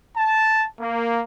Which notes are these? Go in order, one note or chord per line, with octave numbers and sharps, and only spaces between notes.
A5
A#3